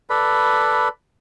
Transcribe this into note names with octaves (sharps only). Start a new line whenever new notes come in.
A4 B4 D5 B5